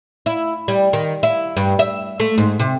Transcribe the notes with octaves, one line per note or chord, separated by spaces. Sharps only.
E4
G3
D#3
E4
G2
E5
A3
G#2
C3